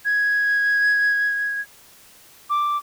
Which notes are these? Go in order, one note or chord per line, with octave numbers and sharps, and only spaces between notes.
G#6
D6